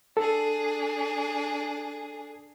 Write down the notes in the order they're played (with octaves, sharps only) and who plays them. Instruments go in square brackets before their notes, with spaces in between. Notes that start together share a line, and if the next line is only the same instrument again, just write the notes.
[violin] D4 G#4 [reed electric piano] A4